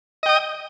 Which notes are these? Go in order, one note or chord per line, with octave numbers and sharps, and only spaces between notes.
D#5 G5 D#6